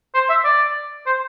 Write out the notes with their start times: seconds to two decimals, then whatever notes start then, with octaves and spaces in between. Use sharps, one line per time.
0.14 C5
0.29 E5
0.44 D5
1.06 C5